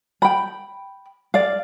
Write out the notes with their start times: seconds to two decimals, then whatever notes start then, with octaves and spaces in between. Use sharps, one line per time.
0.22 G5 B5
1.34 D5 F5